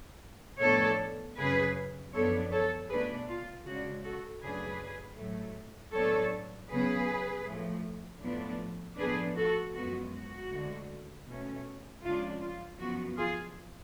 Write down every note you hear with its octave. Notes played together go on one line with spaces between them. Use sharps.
A2 F3 B3 D4 A4 C#5
F#2 C#3 F#3 G#4 B4
F#2 F3 B3 D4 A4 C#5
A4 C#5
B2 A3 D4 G#4 B4
F4
C#3 G#3 D4 F#4
F#4 A4
F#2 C#3 F#3 A3 D4 G#4 B4
A2 F#3 A3
A2 F#3 B3 D4 A4 C#5
C#3 F#3 B3 G#4 B4
A2 F3 A3
A2 F3 B3 D4
A2 F3 B3 D4 G#4 B4
F#4 A4
F#2 F3 G#3 B3 F#4
F#4
D2 D3 G#3
B2 A3 C#4
F2 C#3 G#3 D4 F4
F4
F#2 F3 B3 F#4
F4 G#4